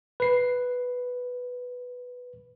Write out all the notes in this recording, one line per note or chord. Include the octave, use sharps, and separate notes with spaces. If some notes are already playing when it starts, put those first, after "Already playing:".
B4 C7